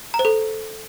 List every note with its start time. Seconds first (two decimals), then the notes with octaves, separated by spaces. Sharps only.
0.14 A#5
0.19 C5
0.25 A4